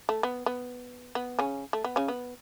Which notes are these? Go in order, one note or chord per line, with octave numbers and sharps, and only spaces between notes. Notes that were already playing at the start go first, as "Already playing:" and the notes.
A3
B3
B3
B3
C#3 C#4
A3
B3
C#3 C#4
B3